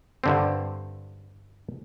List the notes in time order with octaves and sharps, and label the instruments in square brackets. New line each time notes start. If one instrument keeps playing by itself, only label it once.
[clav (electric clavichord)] G2 D3 C4